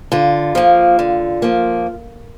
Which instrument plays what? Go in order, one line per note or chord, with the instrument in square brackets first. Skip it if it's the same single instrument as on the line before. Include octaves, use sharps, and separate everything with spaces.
[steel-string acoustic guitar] D3 F4
F3 A#3
D3
F3 A#3